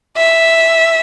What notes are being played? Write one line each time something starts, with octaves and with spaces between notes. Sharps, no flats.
E5